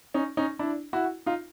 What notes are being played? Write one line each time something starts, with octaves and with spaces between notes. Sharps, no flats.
C#4 D#4
C#4 D#4
D4 E4
E4 F#4
D#4 F4